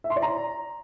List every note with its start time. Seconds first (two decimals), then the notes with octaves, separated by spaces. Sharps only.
0.04 E5
0.10 C6
0.16 D5
0.22 A#5